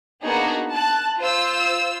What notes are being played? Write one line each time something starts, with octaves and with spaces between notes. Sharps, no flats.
A#3 B3 D4 D#4 F#4 G#4
A5 F#6
F4 C5 E6